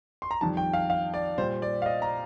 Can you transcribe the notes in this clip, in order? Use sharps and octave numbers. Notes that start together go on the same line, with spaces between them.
C6
A#5
F2 D#3 G3 A5
G5
F5
F5
D5
A#2 G3 C5
D5
F5
D#5
A#5